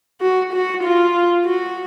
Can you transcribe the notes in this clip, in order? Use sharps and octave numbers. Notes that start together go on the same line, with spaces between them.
F#4
F#4
F4
F#4